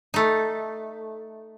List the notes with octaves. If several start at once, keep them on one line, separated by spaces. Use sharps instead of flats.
A3 D#4